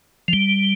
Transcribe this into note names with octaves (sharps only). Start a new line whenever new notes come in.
F3
G3